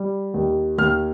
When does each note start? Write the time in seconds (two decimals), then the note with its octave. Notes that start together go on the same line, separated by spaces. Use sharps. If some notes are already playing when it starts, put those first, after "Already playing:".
Already playing: G3
0.34 D#2
0.78 D#2 F6